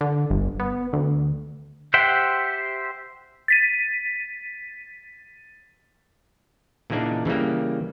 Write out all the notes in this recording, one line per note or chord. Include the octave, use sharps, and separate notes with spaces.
D3
G1
B3
D2
G4 C5 E5 F#5 G5
A6 B6 D#7
A#2 C#3 E3 A#3 D4 D#4
C#3 E3 G3 A#3